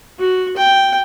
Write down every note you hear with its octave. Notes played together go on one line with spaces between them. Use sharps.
F#4
G5